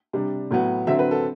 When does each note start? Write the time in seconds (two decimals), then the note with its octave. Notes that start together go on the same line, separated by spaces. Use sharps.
0.13 C3 G3 D4
0.51 A2 F#3 B3
0.87 D3 F#3 C4 E5
0.99 B4
1.11 A4